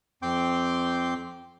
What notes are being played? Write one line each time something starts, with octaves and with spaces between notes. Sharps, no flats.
F2 C4 G5 C6 D6 G6